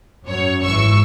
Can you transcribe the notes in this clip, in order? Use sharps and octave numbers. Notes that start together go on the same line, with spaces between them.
F#2 C#5
G#1 E3 C#6 E6